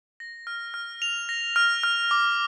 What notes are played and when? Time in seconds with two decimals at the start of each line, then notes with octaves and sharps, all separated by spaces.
0.20 A#6
0.47 F6
0.74 F6
1.02 F7
1.29 A#6
1.56 F6
1.83 F6
2.11 D6